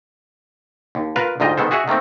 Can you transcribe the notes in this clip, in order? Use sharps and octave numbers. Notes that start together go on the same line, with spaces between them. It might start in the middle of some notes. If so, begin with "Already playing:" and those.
D#2
F4 A#4 B4 F5
D2 G#2 F4 D#5 G5
D#3 G#3 B3 A4 C5
F#4 G#4 E5 F#5 G#5
D#3 A3 A#3 C4